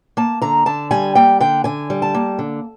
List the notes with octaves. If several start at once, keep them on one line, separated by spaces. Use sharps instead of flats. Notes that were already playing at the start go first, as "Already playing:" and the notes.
A#3 A5
D3 A#5
D3 A5
G3 G#5
A#3 G5
D3 G5
D3 G#5
G3
A5
A#3
D3